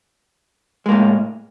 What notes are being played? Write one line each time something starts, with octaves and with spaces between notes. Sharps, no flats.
A2 G#3 A#3